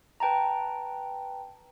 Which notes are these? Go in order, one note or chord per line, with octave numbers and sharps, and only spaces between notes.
B4 G5 A5 A#5